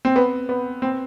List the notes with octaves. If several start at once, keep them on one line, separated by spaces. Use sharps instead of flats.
C4
B3
B3
C4